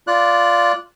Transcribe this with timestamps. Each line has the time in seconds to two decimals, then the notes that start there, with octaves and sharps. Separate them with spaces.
0.07 F4 D5 F#6